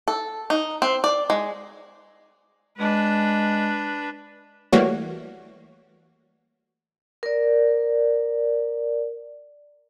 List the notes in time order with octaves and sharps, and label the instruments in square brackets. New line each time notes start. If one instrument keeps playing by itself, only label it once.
[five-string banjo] A4
D#4
C4
D5
G#3
[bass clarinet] G#3 [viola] D4 B4
[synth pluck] E3 G3 A3 A#3 F#4 C#5
[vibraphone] A#4 D5